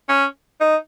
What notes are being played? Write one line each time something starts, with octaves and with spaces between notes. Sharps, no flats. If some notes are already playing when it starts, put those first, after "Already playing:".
C#4
D#4